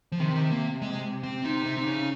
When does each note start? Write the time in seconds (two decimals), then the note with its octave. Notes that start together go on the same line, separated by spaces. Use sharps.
0.12 F3
0.20 C3 D#3
0.35 D#3
0.51 A#3
0.82 G#3
1.23 C4
1.44 C3 D#4
1.66 C3
1.77 D#4
1.87 C#3